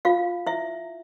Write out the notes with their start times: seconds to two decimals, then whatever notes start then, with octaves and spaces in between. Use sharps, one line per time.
0.05 F4 F5
0.47 E4 E5